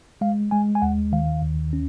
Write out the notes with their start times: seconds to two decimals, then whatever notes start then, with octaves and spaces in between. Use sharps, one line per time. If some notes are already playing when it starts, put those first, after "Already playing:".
0.21 G#3 F5
0.51 G#3 G#5
0.75 G#5
0.82 D#2 F#5
1.12 D#3 F5
1.42 D#2
1.73 C#4